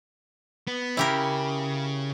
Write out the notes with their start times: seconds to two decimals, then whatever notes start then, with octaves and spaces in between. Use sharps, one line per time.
0.67 B3
0.97 C#3 E4 G4 A#4